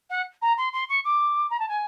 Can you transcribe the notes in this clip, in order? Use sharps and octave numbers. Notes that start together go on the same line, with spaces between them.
F#5
A#5
C6
C6
C#6
D6
A#5
A5
G#5